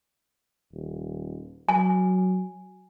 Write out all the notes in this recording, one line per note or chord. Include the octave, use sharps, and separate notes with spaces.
D#1
F#3 G#5